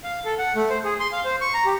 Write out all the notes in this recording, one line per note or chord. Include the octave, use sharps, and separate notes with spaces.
F5
A4
F#5
A3
C5
G#4
C6
F5
C5
C#6
A#5
G4